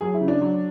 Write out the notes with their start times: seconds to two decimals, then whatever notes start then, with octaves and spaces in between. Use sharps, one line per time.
0.01 F#3 G#4
0.14 E4
0.21 C#3
0.28 D4
0.41 F#3